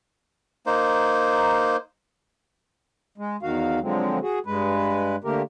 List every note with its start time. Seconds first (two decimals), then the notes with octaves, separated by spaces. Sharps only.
0.66 A#3 D#4 C5
3.18 G#3
3.43 E2 D#3 F#4 F5
3.82 D3 F3 F#3 G#3 C4
4.22 F#4 G#4
4.46 G2 G#3 B4
5.24 D3 A3 A#3 G4 A#4